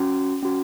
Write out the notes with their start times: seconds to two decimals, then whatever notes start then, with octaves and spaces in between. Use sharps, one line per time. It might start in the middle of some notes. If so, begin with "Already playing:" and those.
Already playing: C#4 F#4
0.43 C#4 F#4